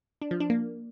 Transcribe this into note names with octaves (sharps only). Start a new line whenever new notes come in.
D4
F3
D4
A#3